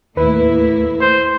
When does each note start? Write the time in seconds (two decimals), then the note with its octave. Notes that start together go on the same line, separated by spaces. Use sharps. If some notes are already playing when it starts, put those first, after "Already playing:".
0.17 D#2 A2 A#3 E4 B4
1.01 C5